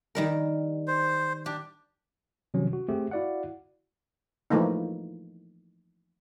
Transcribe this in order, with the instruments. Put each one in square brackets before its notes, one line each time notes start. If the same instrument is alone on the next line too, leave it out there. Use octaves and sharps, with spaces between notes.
[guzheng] D#3 G3 A#4
[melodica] C5
[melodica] D4 [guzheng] G4
[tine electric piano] C3 D#3 F3 F#3 C#4
F#4
A3 C4 G4 G#4
E4 F#4 D5 F5 F#5
[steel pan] E3 F3 A3 A#3 D#4